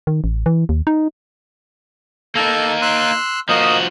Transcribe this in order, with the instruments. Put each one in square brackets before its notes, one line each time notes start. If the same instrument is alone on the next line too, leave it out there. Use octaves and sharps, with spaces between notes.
[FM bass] D#3
A1
E3
D#2
D#4
[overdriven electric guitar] A#3 D#4 [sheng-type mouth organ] A4
[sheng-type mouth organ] C6 E6 F#6
[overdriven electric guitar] F3 F#4 [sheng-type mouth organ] A#3 D#5 D#6